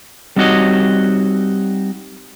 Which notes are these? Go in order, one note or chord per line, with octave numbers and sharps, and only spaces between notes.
G3 C4 D#4 F#4 C#5 D#5